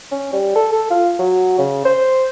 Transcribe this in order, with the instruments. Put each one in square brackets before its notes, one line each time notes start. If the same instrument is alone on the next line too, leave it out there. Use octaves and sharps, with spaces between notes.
[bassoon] C#4
G3
A4
A4
F4
F#3
C#3
C5